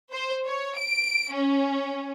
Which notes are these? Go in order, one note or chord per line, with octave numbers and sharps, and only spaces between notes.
C5
C#5
D7
C#4